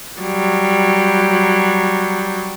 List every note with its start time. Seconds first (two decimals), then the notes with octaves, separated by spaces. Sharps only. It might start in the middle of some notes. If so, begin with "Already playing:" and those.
0.20 F#3 G3